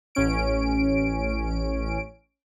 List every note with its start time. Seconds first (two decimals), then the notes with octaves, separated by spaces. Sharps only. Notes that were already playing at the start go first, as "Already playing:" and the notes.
0.15 A1 C#4 D7